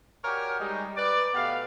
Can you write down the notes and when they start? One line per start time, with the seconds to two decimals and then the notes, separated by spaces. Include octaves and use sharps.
0.24 F#4 G4 A#4 C#5 D5 G#5
0.60 G3 G#3 D#4
0.97 B4 D5
1.34 B2 A3 B3 G4 F5